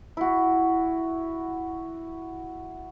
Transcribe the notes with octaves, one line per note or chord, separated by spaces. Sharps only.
E4 F#4